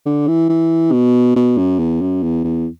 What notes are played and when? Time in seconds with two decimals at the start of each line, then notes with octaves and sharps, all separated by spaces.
0.06 D3
0.28 E3
0.49 E3
0.92 B2
1.36 B2
1.58 F#2
1.79 E2
2.01 F#2
2.23 E2
2.44 E2